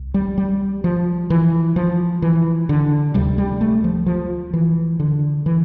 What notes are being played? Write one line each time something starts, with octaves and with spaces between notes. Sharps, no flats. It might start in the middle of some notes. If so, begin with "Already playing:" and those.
Already playing: C2
G3
G3
F3
E3
F3
E3
D3
D2 C3 G3
G3
A3
F3
F3
E3
D3
E3